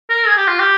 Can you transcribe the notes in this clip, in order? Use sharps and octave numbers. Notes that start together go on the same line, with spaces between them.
A#4
G#4
G4
F4
G4